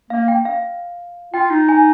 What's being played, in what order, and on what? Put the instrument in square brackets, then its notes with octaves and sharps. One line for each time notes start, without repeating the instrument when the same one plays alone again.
[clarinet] A#3 [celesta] F5
[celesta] G5
F5
[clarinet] F4 [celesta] G5
[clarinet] D#4
[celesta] G#5